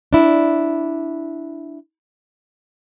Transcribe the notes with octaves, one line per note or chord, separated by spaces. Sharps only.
D4 E4